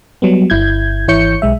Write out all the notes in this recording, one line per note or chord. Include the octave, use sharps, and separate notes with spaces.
F#3 G3 B3
G1 E4 G6 G#6
G#1 E3 E4 C#5 G6 C#7
B1 G#3 E5